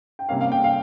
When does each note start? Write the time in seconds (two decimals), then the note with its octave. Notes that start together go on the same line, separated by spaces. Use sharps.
0.19 G5
0.29 C3 G3 A#3 C#4 F5
0.41 F5
0.52 G5
0.64 F5